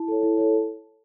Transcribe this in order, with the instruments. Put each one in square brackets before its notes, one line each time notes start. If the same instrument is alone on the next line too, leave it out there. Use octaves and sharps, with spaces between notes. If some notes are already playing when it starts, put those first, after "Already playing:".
Already playing: [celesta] E4 A5
A4 C#5
E4
A4 C#5